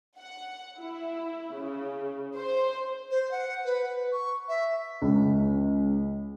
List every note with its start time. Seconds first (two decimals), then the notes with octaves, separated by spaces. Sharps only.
0.18 F#5
0.78 E4
1.54 C#3
2.36 C5
3.11 C5
3.31 F#5
3.65 B4
4.13 C#6
4.49 E5
5.02 C#2